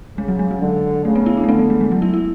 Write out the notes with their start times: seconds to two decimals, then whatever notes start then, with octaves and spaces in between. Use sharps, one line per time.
0.18 C#3 G#3
0.28 F#3
0.39 G#3
0.51 F#3
0.62 D3
1.05 C#3 A3
1.16 B3
1.26 E4
1.37 D4
1.44 A3
1.49 D3 B3
1.59 A3
1.70 G#3
1.81 G#3
1.92 F#3
2.02 E4
2.14 E4